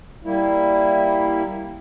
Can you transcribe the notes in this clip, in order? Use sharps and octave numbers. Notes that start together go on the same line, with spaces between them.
G3 A#3 E4